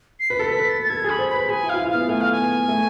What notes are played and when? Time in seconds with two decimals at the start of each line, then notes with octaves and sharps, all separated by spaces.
0.19 C7
0.30 B4 B6
0.39 A4
0.48 B4 B6
0.60 B4
0.69 A6
0.82 A6
0.89 A4 G#6
1.04 G#4
1.10 B5
1.19 C5
1.29 B5
1.34 B4
1.49 G#4 G#5
1.63 E4
1.69 F4 F5
1.80 E4
1.89 F5
1.94 B3
2.08 A3 G#5
2.21 F5
2.32 G#5
2.38 B3
2.68 A3